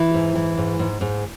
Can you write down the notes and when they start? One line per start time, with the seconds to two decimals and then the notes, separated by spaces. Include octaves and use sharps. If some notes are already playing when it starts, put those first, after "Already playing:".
Already playing: E3 E4
0.14 G#2
0.35 E3
0.58 G#2
0.79 G#2
1.01 G#2